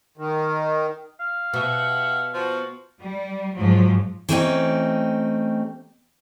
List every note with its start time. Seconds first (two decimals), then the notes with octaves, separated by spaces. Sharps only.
0.17 D#3
1.20 F5
1.53 B2 G4 E5 F#5
2.34 F3 F#4
3.00 G3
3.55 G#2 F3 F#3
4.29 E3 A3 C4 C#4 D#4 G4